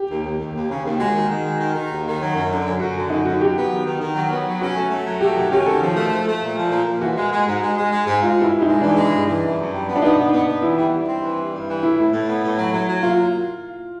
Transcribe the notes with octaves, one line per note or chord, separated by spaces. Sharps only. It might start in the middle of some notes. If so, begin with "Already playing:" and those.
Already playing: G4
D#2
D#2
D#2
D#2
C#3
D#2
G#3 F#4
D#3
D#3
G#3
D#3
D#3
D#2
D#3
F#3
F#2
D3
F#2
F#2 F#4
D3
F#2 D#4
F#2 F#4
F#3 G4
B3
D#3
D#3
D#3
F#3
B3
F#3
C#4 F#4
A3
A3
F#3
A3 G4
D#3 F#4
C#4 G4
D#3 A4
F3
A3
F3
A3
A#2
F3
A#2
A#2
E3 F#4
G#3
G#3
G#2
G#3
G#3
G#3
G#2
G#3 F4
G2 E4
G2
D#4
G#3
E3 D4
G#3
G2
E3
F#2
F#2
G3
B3
D4
B3 D#4
B3
B3
B3
E3 E4
G3
G3
C4
E3
G3
G2
E3
A2 E4
A2
A2
B3
A2
F#3
F#3
F#3
A#3 F4